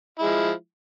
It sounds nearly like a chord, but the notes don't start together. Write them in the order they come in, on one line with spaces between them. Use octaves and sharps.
E4 G#3 F3